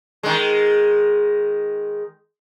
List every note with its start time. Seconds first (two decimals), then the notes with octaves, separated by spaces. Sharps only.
0.23 D#3 G#3